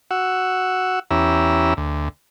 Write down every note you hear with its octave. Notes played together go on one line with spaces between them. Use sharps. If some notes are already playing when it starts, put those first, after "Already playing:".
F#4 F#5 E6
E2 C#4 E4 G4 A#5 E6
D2